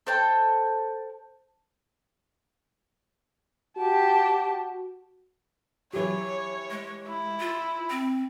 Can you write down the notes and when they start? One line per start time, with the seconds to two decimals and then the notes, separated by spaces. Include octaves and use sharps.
0.07 A4 C5 G5 A5
3.77 F#4 G4 A5
5.93 E3 F#3 G4 C#5
6.71 G#3
7.08 E4
7.40 F4
7.90 C4